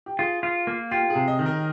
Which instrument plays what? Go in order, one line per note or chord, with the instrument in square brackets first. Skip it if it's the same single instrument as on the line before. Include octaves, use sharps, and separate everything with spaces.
[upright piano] G4
[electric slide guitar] F4 [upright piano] G#4
[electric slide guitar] F4
A#3
[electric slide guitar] F4 [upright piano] G4
[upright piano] G#4
[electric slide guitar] C3
[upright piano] D#5
[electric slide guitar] D#3
[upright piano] A#4